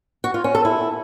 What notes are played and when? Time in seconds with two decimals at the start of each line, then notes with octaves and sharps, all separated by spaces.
0.24 F#4
0.34 F4
0.44 C#4
0.55 A4
0.65 E4